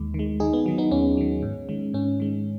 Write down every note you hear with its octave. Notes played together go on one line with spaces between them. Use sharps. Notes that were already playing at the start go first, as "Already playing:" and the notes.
Already playing: D#2 D#3 G#3
D#3 G#3
D#2 D#4 G#4
B3
D#3 F#3
B3 D#4
D#2 C#4
D#3 F#3
G#2
D#3 G#3
G#2 C#4
D#3 G#3